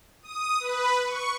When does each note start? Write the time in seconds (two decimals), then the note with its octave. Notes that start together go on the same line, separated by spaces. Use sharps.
0.23 D#6
0.60 B4
1.06 C#6